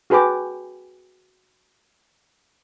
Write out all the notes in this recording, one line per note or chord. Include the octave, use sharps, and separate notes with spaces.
F#4 G#4 B4 G5 D6